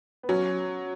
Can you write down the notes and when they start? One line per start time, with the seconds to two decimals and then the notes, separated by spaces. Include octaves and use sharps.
0.23 B3
0.29 F#3 C#4